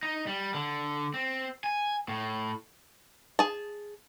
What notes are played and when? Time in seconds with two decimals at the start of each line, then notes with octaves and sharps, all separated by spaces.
0.03 D#4
0.27 G3
0.54 D3
1.14 C4
1.64 G#5
2.09 A2
3.39 G#4 A5